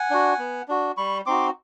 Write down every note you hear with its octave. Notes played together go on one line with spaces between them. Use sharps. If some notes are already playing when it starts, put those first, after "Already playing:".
Already playing: F#5 G#5
D4 F#4
B3
D4 F#4
G3 B5 C#6
C4 D#4 F#4 C6 D6